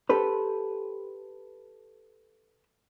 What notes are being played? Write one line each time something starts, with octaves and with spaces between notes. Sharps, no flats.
G4 A4 B4 C5